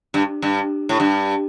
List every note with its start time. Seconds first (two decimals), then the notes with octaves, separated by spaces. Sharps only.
0.14 G2
0.42 G2
0.89 A2
1.00 G2